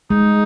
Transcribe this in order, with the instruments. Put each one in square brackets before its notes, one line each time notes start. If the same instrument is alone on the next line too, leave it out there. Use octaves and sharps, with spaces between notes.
[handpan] G#3 [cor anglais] D#4